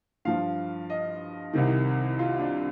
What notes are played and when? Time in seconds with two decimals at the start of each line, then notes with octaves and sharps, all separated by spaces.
0.25 G2 F3 F5
0.90 D#5
1.53 C2 C3 D#3
2.19 F4
2.39 D4